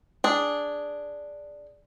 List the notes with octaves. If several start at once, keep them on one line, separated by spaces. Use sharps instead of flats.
D4 G#4